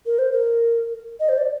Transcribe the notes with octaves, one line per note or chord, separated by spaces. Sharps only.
A#4
C5
A#4
D#5
C5
D5